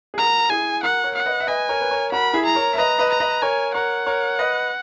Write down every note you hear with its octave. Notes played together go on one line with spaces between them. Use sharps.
G#4
F#4 A#4 A#5
E4 G#4 G#5
F#4 A#4 F#5
A#4 C#5
F#5
B4 D#5
E5
B4 D#5 G#5
A#4 C#5
B4
A#4 C#5
F#4 A#4 B5
E4 G#4
A#5
A#4 C#5
E5
B4 D#5 A#5
B4 D#5
A#5
B4 D#5
A#4 C#5 G#5
A#4 C#5 F#5
A#4 C#5
B4 D#5